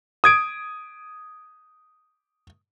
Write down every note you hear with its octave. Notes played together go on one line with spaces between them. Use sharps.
D#6 G#6 D7